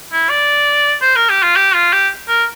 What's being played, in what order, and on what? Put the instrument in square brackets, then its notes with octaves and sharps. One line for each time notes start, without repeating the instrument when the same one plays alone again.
[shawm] E4
D5
C5
A#4
G4
F4
G4
F4
G4
A#4